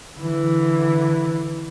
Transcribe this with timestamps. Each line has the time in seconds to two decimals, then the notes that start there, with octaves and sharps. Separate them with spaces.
0.17 D3 E3